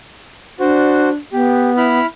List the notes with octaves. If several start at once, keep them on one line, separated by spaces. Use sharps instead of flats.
D4 F#4 C5
B3 G4
E4 B5 F6